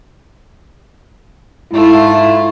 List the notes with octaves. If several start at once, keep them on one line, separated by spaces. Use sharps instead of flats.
G#2 A3 E4 F4